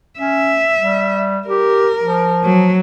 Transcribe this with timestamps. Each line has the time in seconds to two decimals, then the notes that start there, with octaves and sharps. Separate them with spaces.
0.19 C#4 E5
0.79 G3
1.48 G4 A#4
2.00 F3
2.43 F#3